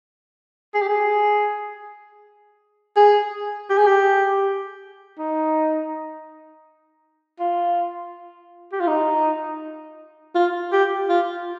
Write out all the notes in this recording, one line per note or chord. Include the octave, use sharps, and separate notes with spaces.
G#4
G4
G#4
G#4
G4
G#4
G4
D#4
F4
G4
F4
D#4
F4
G4
F4